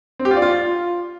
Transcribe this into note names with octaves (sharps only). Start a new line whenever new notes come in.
C4
G4
F4
D5
F4